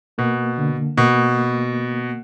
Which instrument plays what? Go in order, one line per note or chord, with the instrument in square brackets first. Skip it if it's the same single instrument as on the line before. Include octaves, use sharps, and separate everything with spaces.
[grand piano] B2 [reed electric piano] A#3
[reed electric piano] D3
[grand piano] B2 [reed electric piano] A#3